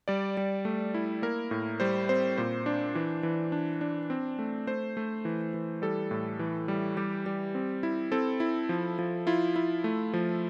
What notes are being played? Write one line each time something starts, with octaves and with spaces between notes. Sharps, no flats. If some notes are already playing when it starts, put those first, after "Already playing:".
G3 D5
G3
A3
E4
A#3 A#4
A2
G3 C5
C4 C5
A#2 C5
D4
E3
E3
D4
D4
C4
A3
A3 C5
A3
E3
E3
G3 A4
A2
E3
G3
G3 G4
G3
C4
E4
C4 A4
E4
F3
F3
E4 F4
E4
A3
F3